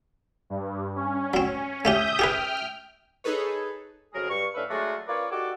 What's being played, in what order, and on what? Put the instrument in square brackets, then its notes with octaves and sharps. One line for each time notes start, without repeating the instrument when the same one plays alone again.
[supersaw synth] G2
C#4
[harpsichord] F#3 C4
[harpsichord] A3 C#4 G4 [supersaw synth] E5 D#6 G6
[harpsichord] G4 G#4 B4 [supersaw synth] G5 F6
[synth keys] D#4 G#4 A4 B4 C#5
[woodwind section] F2 C#3 F#3 G#4 A#4
G2 C#6
A2 C#4 D4 B4 E5 F5
F#3 G#3 A3 D4 F4 F#4
C#4 F4 A#4 B4 C#5 D5
D#4 F#4 G4 A4 D5 D6